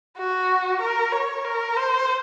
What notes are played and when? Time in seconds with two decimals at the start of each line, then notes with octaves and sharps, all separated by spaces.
0.18 F#4
0.81 A#4
1.12 C#5
1.45 A#4
1.76 C5